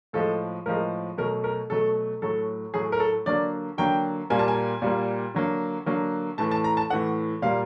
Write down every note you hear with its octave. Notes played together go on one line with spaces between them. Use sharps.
A2 F3 G#3 A4
A2 F3 G#3 A#4
B2 F#3 A3 A#4
A#4
B2 F#3 A3 A4
A2 F#3 A3 A4
A2 F#3 A3 G#4
A#4
A4
D3 F#3 A#3 D5
D3 F#3 A#3 G5
A#2 G3 A#3 G#5
A5
G#5
A#2 G3 A#3
D3 F#3 A#3
D3 F#3 A#3
A2 E3 A3 A5
A5
A#5
A5
A2 E3 A3 F#5
A#2 G3 A#3 F5